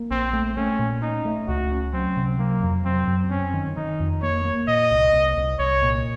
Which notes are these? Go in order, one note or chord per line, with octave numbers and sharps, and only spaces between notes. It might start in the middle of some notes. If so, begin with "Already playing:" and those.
Already playing: A#3
A#1 C4
A3
A3 C#4
A#2
C#4 D#4
A3
C#2 F#4
C#4
F#3 C4
C3
F#3 A#3
F2
F#3 C4
F#2
C4 C#4
D#3
D#3 D#4
F2
A#3 C#5
A#3
A#2 D#5
C2
C2
C2
C2 C#5
A#2